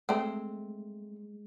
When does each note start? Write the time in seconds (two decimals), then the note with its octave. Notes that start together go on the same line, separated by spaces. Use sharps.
0.09 G#3 A3 C4